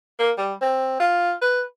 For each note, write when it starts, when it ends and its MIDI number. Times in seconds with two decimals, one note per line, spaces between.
0.19 0.31 58
0.37 0.53 55
0.61 0.99 60
1.00 1.32 65
1.42 1.62 71